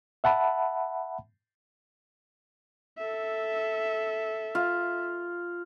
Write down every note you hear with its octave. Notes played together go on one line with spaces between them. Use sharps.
E5 F#5 A5 B5
A4 E5
F4